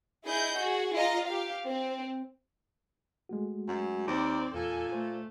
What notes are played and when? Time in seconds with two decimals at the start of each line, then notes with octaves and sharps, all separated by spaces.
0.24 E4 G#4 D#5 G6
0.57 F#4 G#4
0.95 F4 D#5 A#5
1.26 G4 F5
1.67 C4
3.29 G#3 A3 F#4
3.68 F#2
4.08 D#2 C4 D5 A#5
4.54 E2 A#2 A4 G#5
4.92 A3 C5